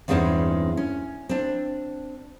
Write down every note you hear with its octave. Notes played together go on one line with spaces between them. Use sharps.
E2 G2 G#3 C4 C#4 D#4
C#4
C4 D4